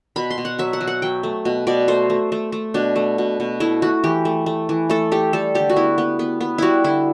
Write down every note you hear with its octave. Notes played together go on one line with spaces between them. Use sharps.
B2 B5
C6
B2
F#5
F#3 E5
F#5
F#3
F#5
F#3 G5
A3
B2
B2 D5
A3 C5
A3
A3
A3
B2 D4
A3
B2
B2
A3 E4
A3 F#4
E3 G4
A3
A3
E3
A3 A4
A3 G4
G3 A4
D3 G4
F#4
B3 E4
B3
B3
B3
G3 E4 F#4
D3 E4